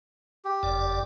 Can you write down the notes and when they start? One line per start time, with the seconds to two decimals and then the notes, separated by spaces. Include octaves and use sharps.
0.45 G4
0.63 F#1 F2 D5